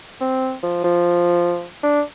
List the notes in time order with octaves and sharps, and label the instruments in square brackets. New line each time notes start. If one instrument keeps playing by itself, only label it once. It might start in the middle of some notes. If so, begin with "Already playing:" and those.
[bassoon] C4
F3
F3
D4